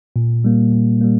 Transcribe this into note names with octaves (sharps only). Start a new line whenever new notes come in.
A#2
G3 A#3
A#2
G3 A#3